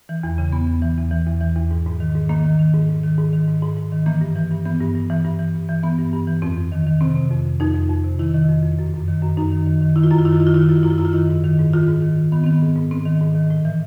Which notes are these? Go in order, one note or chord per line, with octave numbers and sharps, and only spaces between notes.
E3
E2
C#3
E2 B3
E2
E3
E2
E3
E2
E3
E2
G#2
G#2
D#3
G#2
D#3 A#3
D#3
D#3
G#2
G#2
D#3
G#2
D#3
G#2
G#2
G#2
D#3
E3 A#3
G2
E3
G2
E3 B3
G2
G2
E3
G2
E3
G2
E3
E3 B3
G2
G2
E3
F2 C4
F2
D#3
D#3
C3 C4
C3
F2
F2
F2 D#4
F2
F2
C3
D#3 E4
D#3
F2
F2
F#2
F#2
D#3
F#2
F#2 D#4
D#3
D#3
D#3
D#3 E4
F4
F#2 E4
F4
D#3 E4
F4
D#3 E4
F4
D#3 E4
F4
F#2 E4
F4
F#2 E4
F4
F#2 E4
F4
D#3 E4
G#2
D#3
G#2
D#3 F4
G#2
D#3
D#3
D#3 B3
D#3 C4
B3
G#2
G#2
G#2 C4
D#3
G#2
D#3
A2
E3